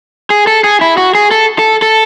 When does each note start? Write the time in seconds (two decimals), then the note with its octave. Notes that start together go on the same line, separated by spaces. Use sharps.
0.30 G#4
0.47 A4
0.64 G#4
0.81 E4
0.97 F#4
1.15 G#4
1.31 A4
1.59 A4
1.82 A4